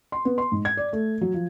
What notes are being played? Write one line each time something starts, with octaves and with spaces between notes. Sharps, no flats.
C6
B3
C6
G#2
G#6
D5
A3
F#3
F3